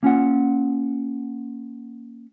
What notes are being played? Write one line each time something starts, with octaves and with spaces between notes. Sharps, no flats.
A#3 C#4 F4 F#5